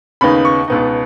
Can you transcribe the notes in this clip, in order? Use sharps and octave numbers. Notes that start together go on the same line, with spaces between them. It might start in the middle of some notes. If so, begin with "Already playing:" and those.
D#2 C#3 B3 D#4 B5
C#6
C#2 B2 B3 D#4